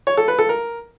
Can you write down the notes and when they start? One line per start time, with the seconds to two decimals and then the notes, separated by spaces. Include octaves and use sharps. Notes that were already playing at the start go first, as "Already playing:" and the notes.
0.07 C#5
0.17 A4
0.28 B4
0.39 A4
0.49 A#4